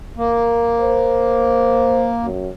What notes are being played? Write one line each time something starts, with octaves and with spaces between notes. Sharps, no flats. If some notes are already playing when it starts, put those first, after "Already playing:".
A#3
C5
F#2